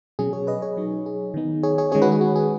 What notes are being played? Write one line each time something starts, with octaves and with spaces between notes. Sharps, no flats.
B2 F#3 C#4 G#4
G#4 C#5
B4 D#5
G#4 C#5
F#3 D#4
G#4
D#3 B3 D#4
G#4 C#5
G#4 C#5
D#3 G#3 C#4 G#4 C#5
F#4 B4
G#4
F#4
G#4